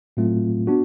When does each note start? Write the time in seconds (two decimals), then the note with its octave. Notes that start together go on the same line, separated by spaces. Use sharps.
0.17 A2 F#3 A3 C4 F4
0.67 B3 D4 F#4